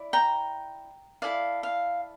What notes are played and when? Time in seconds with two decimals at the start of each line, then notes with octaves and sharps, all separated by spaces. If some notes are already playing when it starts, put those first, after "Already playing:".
Already playing: E4 D5
0.13 G5 A#5
1.22 E4 A4 D5 F5
1.63 F5